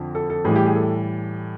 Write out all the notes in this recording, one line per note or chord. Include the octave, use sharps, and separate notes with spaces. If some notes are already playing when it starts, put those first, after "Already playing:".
Already playing: F2 D3 F3
A4
A4
A2 E3 G3 G#4
G4
G#4
A4